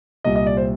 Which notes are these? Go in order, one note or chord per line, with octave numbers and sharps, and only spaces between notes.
C2 A#2 G3 D#5
D#5
D5
C5